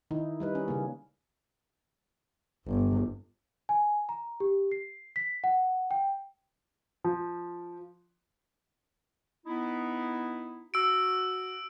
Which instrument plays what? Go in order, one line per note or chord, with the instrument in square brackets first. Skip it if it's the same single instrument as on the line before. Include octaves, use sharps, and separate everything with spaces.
[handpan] D#3 D#4 E4
G3 D#4 B4
C#4
C#3 A#3
[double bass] G1
[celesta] G#5
A#5
G4
C7
B6
F#5
G5
[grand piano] F3
[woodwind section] B3 D#4 E4
[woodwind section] F#4 [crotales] E6 D7